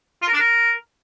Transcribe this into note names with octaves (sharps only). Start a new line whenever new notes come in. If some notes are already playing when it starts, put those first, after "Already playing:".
F4
A#4
D4
A#4